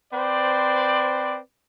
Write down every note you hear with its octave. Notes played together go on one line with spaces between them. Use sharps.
C4 B4 C5 D5